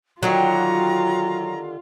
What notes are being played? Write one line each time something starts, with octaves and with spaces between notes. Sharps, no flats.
D3 D#3 F#3 F4 G4 A#5